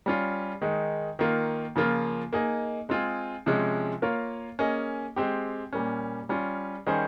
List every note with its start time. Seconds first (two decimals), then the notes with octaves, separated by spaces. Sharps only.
0.06 G3 C#4 F4
0.62 D#3 G#3 D#4
1.19 D#3 A#3 F4
1.76 C#3 F3 A#3 F4
2.33 A#3 D#4 G#4 D#5
2.89 G#3 C4 F4 G#4
3.46 C3 F3 G#3 C#4
4.02 A#3 F4 A#4 C#5 F5
4.59 A#3 C#4 G#4 D#5
5.16 G#3 C4 G4
5.73 A#2 G3 A#3 C#4
6.29 G3 C#4 F4
6.87 D#3 G3 C#4 G#4 C5